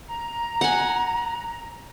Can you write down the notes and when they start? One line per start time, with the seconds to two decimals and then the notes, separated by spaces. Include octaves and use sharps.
0.07 A#5
0.61 F#5 G#5